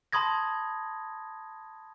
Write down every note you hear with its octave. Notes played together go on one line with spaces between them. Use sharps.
A5 B5 C6 D#6 G#6 A#6